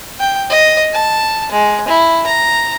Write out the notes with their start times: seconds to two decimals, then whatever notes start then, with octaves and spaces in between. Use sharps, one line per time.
0.20 G5
0.50 D#5
0.93 A5
1.51 G#3
1.88 E4
2.26 A#5